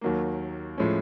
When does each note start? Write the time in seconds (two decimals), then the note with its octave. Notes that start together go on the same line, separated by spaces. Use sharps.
0.01 D#2 D#3 F#3 A#3
0.78 A2 F3 G#3 C#4